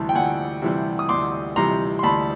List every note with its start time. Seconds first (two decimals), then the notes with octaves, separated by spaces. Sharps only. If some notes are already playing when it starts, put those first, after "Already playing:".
Already playing: D2 C3 E3 G3 A5
0.09 G5
0.15 D2 F#5 G#5
0.62 C3 E3 G3
0.99 D#6
1.09 D2 C6 D6
1.56 C3 E3 G3 A#5 C6
1.99 C6
2.03 D2 A5 B5